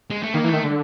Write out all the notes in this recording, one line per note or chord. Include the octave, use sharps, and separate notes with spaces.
G#3
A3
D#3 A#3
E3
D#3 A3
D3